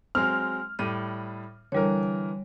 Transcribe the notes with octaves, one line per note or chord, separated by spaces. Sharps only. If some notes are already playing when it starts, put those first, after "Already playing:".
F#3 G#3 C4 F6
A2 G3 D#7
D3 E3 G3 A#4 C#5